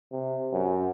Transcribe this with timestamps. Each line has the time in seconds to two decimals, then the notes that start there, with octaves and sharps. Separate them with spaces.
0.12 C3
0.53 F#2